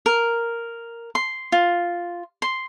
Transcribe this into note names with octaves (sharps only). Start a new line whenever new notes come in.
A#4
C6
F4
C6